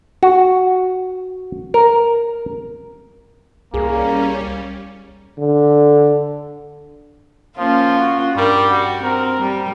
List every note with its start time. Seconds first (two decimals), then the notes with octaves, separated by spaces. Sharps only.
0.23 F#4
1.74 A#4
3.74 C2 G3 A#3 C#4 G#4
5.38 D3
7.58 F3 A#3 C#4 F4
7.99 F#4
8.36 G2 G3 A#4
8.69 F#4
9.03 C4 A#4
9.41 G3